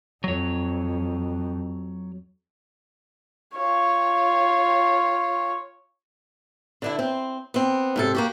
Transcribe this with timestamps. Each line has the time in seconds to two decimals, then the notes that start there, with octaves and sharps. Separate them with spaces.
0.24 F2 F#3 C#5
3.56 F4 C#5
6.82 D3 D4 E4
6.99 C4 C5
7.54 B3 C4
7.96 G#2 C3 A4
8.15 A#3 F#4 G4